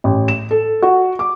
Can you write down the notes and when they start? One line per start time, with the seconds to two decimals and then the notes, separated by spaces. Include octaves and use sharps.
0.04 A1
0.28 E7
0.51 A4
0.82 F#4
1.19 D6